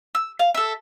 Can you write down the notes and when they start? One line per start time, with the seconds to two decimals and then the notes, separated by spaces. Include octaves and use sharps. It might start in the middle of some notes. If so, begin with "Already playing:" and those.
0.15 E6
0.39 F5
0.54 A4 E5